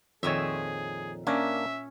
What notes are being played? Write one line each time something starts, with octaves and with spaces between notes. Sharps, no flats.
F2 A#2 D#3 G#4 C#5 E5
A#3 C#4 D4 A#4 E5